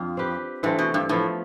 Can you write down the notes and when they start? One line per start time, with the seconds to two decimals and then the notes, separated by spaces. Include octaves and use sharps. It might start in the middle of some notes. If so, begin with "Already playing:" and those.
Already playing: F2 D4 F4
0.17 C4 G4 B4
0.63 G2 E3 A3 C4
0.79 B2
0.94 G2
1.09 A2 F3 B3 E4